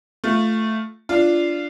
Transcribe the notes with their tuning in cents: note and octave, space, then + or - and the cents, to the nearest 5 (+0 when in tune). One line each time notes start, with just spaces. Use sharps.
A3 +0 F4 +0
D4 +0 F4 -15